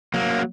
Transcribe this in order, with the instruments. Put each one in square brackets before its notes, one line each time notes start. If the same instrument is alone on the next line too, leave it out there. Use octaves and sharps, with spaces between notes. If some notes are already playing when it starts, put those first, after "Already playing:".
[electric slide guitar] F#3 A#3